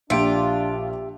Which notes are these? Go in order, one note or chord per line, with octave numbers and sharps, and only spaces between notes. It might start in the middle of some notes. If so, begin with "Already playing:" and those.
A#1 D4 F4 G4 E5 G5 D7